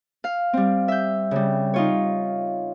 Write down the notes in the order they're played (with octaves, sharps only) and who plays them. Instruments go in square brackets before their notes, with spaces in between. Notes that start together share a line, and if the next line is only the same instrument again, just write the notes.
[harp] F5
G3 C4
E5 G6
C#3 G3
D#4 F4 C#5